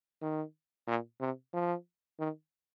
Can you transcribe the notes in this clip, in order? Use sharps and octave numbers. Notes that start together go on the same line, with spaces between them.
D#3
A#2
C3
F3
D#3